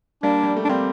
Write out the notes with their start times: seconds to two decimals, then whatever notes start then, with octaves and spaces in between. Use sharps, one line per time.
0.23 G3 A#3 D4
0.43 G3
0.57 A3
0.65 D4
0.69 G3 A#3 C4